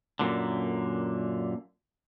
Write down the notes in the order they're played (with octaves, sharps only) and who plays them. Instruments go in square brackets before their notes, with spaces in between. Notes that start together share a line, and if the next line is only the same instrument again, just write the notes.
[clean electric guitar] F#2 A#2 D3